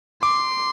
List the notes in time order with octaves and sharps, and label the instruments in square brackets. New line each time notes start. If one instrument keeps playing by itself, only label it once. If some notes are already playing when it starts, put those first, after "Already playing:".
[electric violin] C6 [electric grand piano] D6